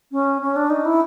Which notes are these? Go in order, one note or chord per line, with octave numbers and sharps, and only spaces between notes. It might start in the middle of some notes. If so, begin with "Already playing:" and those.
C#4
C#4
D4
D#4
E4